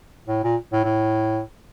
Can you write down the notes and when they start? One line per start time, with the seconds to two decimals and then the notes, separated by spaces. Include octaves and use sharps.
0.27 A2
0.44 A#2
0.72 A2
0.84 A2